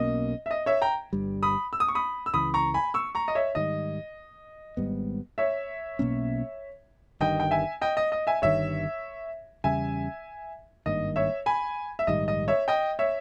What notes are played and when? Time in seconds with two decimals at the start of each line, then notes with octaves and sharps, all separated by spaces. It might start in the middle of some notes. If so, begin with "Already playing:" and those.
Already playing: B1 B2 A#3 C#4 D#5
0.46 E5
0.51 D#5
0.66 C#5 E5
0.82 G5 A#5
1.13 G1 G2 G3
1.43 B5 D#6
1.73 E6
1.80 D#6
1.88 C#6
1.95 B5 D#6
2.26 E6
2.34 C#2 C#3 E3 B5 D#6
2.54 A#5 C#6
2.74 G#5 B5
2.94 C#6 E6
3.15 A#5 C#6
3.28 D#5
3.35 C#5 E5
3.55 G#2 D#3 G3 D#5
4.77 G#1 G#2 G3 B3
5.38 C#5 E5
5.99 B1 B2 A#3 C#4
7.20 G1 G2 D#3 D#5 G5
7.40 G5
7.51 E5 G#5
7.81 D#5 G5
7.97 D#5
8.12 D#5
8.27 E5 G#5
8.42 G1 G2 D#3 C#5 E5
9.64 E2 C#3 G3 C#4 E5 G#5
10.86 G#1 G2 D#3 A#3 D#5
11.16 C#5 E5
11.46 G#5 B5
11.99 E5
12.07 A#1 G#2 D#3 G3 D#5
12.28 D#5
12.48 C#5 E5
12.68 D#5 G5
12.99 C#5 E5